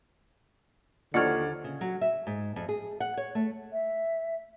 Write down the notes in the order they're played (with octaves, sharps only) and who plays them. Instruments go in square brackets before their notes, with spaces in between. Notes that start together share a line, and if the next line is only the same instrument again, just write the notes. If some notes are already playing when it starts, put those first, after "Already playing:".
[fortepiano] D#2 F3 C#6 [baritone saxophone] D3 [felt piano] D5 F6 [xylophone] F#5 G#6
[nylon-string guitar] C#3
F#3
E5
G#2
F2
G#4
F#5
C#5
A3
[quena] E5